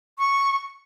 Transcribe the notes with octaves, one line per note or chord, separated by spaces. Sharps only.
C#6